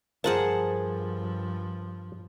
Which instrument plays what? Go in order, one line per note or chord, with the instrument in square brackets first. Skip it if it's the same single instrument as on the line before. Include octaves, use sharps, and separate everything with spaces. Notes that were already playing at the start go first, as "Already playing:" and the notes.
[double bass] G2 F3 [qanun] G#4 F#5 A5 [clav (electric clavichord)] A#4 C5